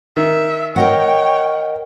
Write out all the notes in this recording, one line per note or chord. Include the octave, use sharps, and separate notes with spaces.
D#3 E5
A#4 C#5 D#5 F#5 G5